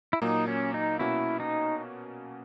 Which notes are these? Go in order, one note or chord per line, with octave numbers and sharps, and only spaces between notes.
E4
A#2 F#3 A#3 D#4
C#4
D#4
B2 A#3 C#4 E4 F#4
D#4